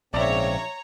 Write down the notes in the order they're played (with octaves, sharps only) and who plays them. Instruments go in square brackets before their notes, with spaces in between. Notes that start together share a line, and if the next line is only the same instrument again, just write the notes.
[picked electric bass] A#1 [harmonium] G#2 C#3 C4 [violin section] C#5 A#5 [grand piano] D5 E5